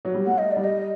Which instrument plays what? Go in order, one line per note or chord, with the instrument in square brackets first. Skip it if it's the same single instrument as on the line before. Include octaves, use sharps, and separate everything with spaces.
[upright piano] F#3
G3
[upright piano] A3 [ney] F#5
[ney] D#5
[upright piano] G3 [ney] D5
[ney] D#5